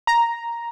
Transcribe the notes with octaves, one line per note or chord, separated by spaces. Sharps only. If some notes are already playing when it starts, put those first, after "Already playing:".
A#5